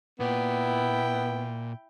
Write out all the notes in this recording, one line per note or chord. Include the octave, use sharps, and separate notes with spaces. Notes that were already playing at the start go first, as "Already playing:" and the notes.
A#2 B3 E4 G5